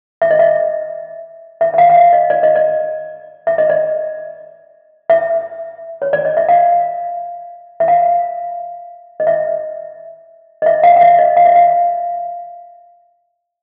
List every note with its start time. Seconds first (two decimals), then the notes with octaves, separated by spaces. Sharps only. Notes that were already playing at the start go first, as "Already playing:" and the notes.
0.22 E5
0.31 D#5
0.39 E5
1.61 E5
1.74 E5
1.78 F5
1.90 F5
1.96 E5
2.13 D#5
2.30 D5
2.43 D#5
2.56 D5
3.47 E5
3.58 D#5
3.70 D5
5.10 E5
6.02 C#5
6.13 D5
6.25 D#5
6.37 E5
6.48 F5
7.80 E5
7.88 F5
9.20 D#5
9.27 E5
10.62 D#5
10.66 E5
10.83 F5
10.96 F5
11.01 E5
11.19 D#5
11.37 F5
11.46 E5
11.55 F5